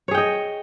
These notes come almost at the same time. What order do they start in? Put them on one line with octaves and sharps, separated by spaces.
C#5 G#4 G5 D#5